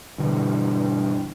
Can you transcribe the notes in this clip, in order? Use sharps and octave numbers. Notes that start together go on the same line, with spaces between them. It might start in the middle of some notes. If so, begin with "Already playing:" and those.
G2 B2 D3 E3